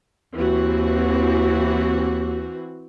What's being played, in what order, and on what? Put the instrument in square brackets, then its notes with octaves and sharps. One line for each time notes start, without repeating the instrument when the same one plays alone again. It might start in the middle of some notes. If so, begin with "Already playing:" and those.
[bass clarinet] D#2 [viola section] E3 C4 F#4